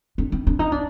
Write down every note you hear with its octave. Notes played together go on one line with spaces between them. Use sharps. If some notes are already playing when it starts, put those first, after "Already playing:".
D4
D#4
D4
D#4
D4